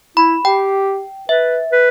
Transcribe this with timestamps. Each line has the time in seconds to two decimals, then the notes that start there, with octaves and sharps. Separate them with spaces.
0.17 E4 B5
0.44 G4 G5
1.29 B4 E5
1.72 B4